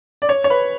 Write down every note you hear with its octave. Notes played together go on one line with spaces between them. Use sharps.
D5
C#5
C#5
B4